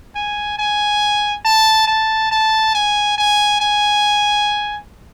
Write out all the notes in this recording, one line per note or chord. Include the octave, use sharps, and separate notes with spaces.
G#5
G#5
A5
A5
A5
G#5
G#5
G#5